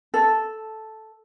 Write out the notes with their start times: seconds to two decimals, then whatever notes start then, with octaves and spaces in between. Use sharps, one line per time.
0.14 A4